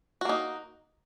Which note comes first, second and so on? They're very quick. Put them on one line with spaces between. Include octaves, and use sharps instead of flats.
F#4 A#3 D#4